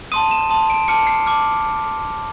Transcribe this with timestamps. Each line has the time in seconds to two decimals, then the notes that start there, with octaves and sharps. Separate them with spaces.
0.12 A5 C6 D#6 D#7
0.31 E7
0.50 A5 C6 D#6
0.70 D7
0.88 A5 D6 F6 C#7
1.07 C7
1.26 A5 D6 F6